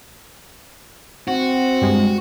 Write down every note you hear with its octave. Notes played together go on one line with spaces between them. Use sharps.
C4 F#4
G2 G3 G#3